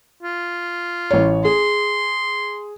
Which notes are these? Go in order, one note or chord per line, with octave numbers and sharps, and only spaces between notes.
F4
A1 C#5
G#4 C6